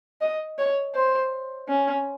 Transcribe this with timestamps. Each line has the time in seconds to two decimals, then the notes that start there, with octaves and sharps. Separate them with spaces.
0.21 D#5
0.58 C#5
0.95 C5
1.68 C#4